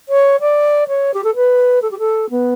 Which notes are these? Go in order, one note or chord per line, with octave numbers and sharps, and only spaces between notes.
C#5
D5
C#5
G4
A4
B4
A4
G4
A4
B3